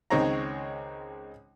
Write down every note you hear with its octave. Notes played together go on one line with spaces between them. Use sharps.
C#2 D#3 G#3 C4 C#5 A#5